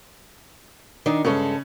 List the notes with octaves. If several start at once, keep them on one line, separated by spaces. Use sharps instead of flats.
D#3 D4 D#4
G2 C#3 G#3 C#4 A4